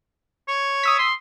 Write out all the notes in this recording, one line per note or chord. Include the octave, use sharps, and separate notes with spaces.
C#5
D#6 E6 B6
C6